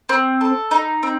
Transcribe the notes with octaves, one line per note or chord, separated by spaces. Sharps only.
C4
A4
D#4
C4